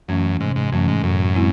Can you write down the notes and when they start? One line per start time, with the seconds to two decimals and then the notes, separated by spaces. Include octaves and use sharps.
0.09 F#2 E3 A3 C#4
0.40 G#2 C3
0.56 G#2
0.72 F#2 E3 A3 C#4
0.88 G#2
1.03 F#2 A2
1.35 G#3 C4 E4